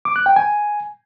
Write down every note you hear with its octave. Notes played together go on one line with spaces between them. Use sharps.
D6
F#6
G5
G#5